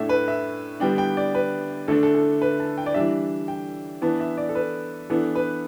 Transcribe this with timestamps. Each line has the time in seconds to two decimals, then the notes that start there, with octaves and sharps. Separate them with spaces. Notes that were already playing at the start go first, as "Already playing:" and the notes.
Already playing: A2 A3 D4 E5
0.09 B4
0.28 E5
0.80 D3 G3 B3 D4 G5
0.98 G5
1.17 D5
1.35 B4
1.88 D3 A3 D4 A4
2.03 A4
2.15 A4
2.42 B4
2.60 A5
2.78 G5
2.86 D5
2.94 E3 G3 D4 E5
3.48 G5
4.02 E3 B3 D4 A5
4.20 E5
4.38 D5
4.49 A4
4.55 B4
5.10 E3 B3 D4 A4
5.35 B4